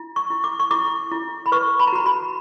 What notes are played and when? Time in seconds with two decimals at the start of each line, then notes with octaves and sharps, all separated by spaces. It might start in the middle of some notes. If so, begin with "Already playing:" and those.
Already playing: E4
0.16 C#6
0.30 E4
0.44 D6
0.60 C#6
0.71 E4 D6
1.12 E4
1.46 B5
1.52 B4 C#6
1.79 B5
1.87 A#5
1.93 F#4 B5
2.06 B5